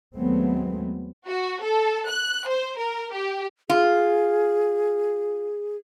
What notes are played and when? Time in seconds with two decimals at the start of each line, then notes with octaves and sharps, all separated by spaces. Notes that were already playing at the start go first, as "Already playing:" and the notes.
0.15 D#2 F#3 G#3 A3 B3 C4
1.27 F#4
1.63 A4
2.09 F#6
2.48 C5
2.78 A#4
3.13 G4
3.70 F4 G#4